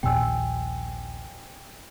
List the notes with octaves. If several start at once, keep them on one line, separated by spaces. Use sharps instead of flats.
A#1 D#2 A#2 G5 G#5 E6